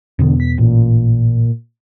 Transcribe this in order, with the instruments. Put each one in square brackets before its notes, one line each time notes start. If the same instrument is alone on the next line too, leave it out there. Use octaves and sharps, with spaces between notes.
[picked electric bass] E2 B2 B3 [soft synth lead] D3
[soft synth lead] B6
[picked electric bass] A1 [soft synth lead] A#2